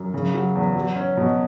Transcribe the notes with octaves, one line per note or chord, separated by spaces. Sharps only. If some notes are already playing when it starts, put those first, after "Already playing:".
Already playing: F#2
C#3
F#3
E2
F#3
C#4
B2